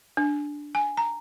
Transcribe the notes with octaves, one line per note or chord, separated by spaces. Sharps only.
D4
G#5
A#5